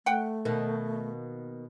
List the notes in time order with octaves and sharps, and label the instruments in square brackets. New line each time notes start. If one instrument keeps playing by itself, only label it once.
[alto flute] A3 [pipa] F#5 G5
[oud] B2 D#3 A#3